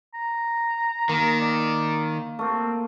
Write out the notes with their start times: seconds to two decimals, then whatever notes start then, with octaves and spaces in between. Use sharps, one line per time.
0.14 A#5
1.09 D#3 A#3
1.41 D5
2.39 A3 A#3 C4